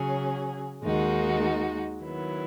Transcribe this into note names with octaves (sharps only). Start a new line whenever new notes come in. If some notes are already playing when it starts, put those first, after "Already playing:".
Already playing: C#3 F#3 C#4 G#4
D#2 D#3 G#3 D#4 F#4
D#3 F#3 B3 E4